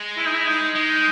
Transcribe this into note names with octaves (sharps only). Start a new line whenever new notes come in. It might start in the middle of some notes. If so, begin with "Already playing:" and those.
Already playing: G#3
E4
D#4
E4
D#4
G#3 D#4